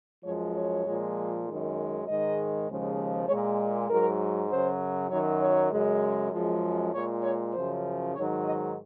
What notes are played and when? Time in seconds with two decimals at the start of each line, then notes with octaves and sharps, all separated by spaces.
0.24 F#2 F3 G#3 C#5
0.55 C#5
0.85 A#2 F3 G#3
1.46 F#2 D#3 G#3
2.07 G#2 D#3 G#3 D#5
2.68 D#2 C#3 F3 G#3
3.28 G#3 C#5
3.33 A#2
3.89 G#2 F#3 A#4
4.50 F#2 C#3 F#3 C5
5.10 F#2 D#3 F#3 C#5
5.40 C#5
5.72 F#2 C#3 G#3
6.32 F#2 F3 G#3
6.93 A#2 G#3 C#5
7.23 C#5
7.54 F#2 C#3 F3 C5
8.15 G#2 D#3 F#3 C#5
8.44 D#5